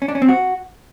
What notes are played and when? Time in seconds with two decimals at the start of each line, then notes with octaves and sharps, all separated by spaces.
0.02 C#4
0.08 D4
0.15 C#4
0.22 C4
0.28 F#4